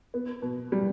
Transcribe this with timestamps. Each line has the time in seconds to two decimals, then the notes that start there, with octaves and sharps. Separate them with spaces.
0.14 B3
0.42 B2
0.72 G3